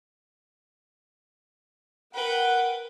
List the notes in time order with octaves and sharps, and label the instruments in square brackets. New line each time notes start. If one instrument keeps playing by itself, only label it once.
[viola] A#4 [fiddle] B4 G5 [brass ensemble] F#5